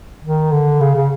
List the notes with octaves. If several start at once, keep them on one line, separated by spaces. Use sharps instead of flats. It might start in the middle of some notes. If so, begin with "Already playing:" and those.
D#3
D3
C#3
C#3